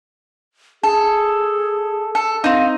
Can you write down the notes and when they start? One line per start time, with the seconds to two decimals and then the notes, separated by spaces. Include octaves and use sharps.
0.83 G#4 A4
2.15 A4
2.44 C4 D#4 F5